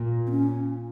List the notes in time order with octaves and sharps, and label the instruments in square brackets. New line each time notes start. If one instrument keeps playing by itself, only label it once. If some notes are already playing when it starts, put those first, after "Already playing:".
Already playing: [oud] A#2
[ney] C4
C#4